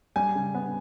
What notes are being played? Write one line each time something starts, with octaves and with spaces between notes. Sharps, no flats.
G3 G#5
C#3
B3